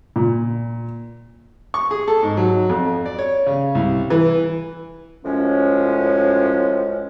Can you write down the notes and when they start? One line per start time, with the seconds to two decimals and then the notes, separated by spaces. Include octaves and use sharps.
0.16 A#2
1.74 C#6
1.91 G#4
2.08 A4
2.23 G#2
2.37 F#3
2.69 F2
3.06 D5
3.19 C#5
3.46 C#3
3.75 C2
4.10 E3
5.24 F#2 A2 F3 G#3 C#4